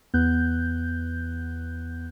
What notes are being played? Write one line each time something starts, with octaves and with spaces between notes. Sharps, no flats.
E2 B3 F#6 G6